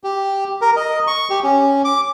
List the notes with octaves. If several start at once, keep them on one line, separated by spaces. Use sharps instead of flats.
G4
A#4
D#5
C#6
G4
C#4
D6